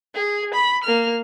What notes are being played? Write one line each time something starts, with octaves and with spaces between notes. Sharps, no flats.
G#4
B5
A#3 F6